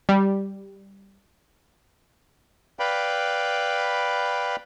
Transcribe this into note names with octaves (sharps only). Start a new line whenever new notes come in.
G3
B4 D5 F5 G5 B5